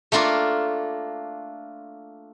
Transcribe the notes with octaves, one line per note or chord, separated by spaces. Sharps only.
A3 A#3 D4 F4 A#4